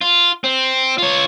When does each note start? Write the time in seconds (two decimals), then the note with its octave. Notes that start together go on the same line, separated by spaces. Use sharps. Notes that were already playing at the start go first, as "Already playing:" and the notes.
0.01 F4
0.44 C4
0.98 F4 C#5